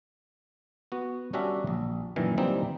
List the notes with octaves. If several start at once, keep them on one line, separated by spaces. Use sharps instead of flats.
B3 F#4
G3 C#4 D4 F#4 A#4 E5
A#1
F#2 A#2 D#3 E3
E3 G3 A#3 C4 D#4